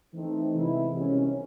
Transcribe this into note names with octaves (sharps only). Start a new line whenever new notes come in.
E3 A3 C4 D#4
C3 E3 G#3 B3 E4
C2 C3 D#3 G#3 C#4